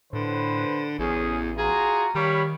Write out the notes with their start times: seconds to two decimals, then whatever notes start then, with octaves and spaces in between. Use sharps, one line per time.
0.13 A2 D3 B4 C5
0.99 A1 E2 C#4 G#4
1.58 F4 F#4 G#4 A#5
2.15 D#3 G3 C#5 F5 B5